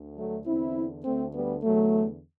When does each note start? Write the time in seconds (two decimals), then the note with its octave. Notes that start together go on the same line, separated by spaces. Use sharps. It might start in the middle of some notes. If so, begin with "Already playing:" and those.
Already playing: D2 D3
0.17 F#3 A3
0.46 E2 D3 C4 E4
1.05 D2 D3 A3 C4
1.34 G3 B3
1.63 E2 D3 F#3 A3